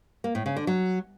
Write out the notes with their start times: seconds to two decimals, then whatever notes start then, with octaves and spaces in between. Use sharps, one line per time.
0.24 A#3
0.35 A2
0.46 C#3
0.56 D3
0.67 F#3